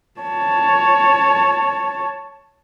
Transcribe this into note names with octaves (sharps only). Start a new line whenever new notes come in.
C#5 A5